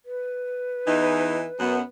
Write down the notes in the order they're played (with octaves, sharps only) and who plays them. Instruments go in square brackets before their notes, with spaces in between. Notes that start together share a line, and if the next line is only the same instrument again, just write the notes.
[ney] B4
[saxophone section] E2 E3 D#4
F#2 B3